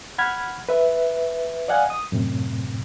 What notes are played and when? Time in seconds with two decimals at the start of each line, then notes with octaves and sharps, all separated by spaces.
0.18 F#5 B5 F6 G#6
0.69 B4 E5
1.68 D5 D#5 F5 F#5 G#5
1.90 D#6
2.12 F#2 A2 C3